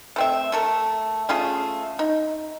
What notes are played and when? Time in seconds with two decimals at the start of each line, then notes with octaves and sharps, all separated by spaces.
0.16 A3 C4 E5
0.52 A3 A4 A#4
1.29 A3 C#4 F4 G#4
1.99 D#4